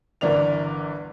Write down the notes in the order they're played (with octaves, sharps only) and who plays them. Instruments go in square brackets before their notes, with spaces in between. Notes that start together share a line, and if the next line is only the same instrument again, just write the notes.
[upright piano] G1 D3 E3 A#4 D5 F7